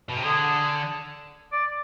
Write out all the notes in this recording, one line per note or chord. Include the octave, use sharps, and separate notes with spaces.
B2
C3
D3 G#4
D5